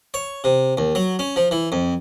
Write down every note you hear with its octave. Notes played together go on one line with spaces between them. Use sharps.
C#5
C3
D#2
F#3
C#4
F3
E3
F2